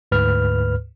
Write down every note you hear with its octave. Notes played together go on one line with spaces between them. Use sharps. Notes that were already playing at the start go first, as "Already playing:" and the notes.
D2 G#2 B4 F6